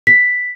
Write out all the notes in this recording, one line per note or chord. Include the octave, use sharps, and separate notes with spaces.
B6